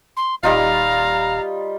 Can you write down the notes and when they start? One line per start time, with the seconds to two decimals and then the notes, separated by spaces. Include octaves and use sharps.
0.17 C6
0.43 D#1 G3 D#4 F4 F5 A#5